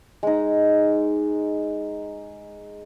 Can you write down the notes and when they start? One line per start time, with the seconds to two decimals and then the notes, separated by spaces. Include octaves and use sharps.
0.23 G#3 D#4